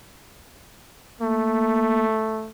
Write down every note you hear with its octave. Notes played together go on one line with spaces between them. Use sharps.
A3 A#3